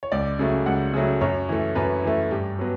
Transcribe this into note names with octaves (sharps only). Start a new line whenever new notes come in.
C#5
C#2 D5
C#3 F#3 A3
C#2 F#5
C#3 F#3 A3
F#2 C#5
E3 A3
F#2 B4
E3 A3
G2 G4
F#3 B3